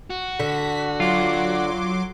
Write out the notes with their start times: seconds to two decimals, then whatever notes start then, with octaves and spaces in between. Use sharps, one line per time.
0.10 F#4
0.40 D3 B6
1.00 F#3 F4 C6 D6